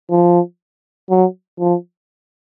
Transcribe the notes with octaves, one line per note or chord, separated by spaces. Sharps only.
F3
F#3
F3